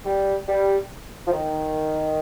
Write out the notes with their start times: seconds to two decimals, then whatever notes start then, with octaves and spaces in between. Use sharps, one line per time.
0.05 G3
0.48 G3
1.27 F3
1.32 D#3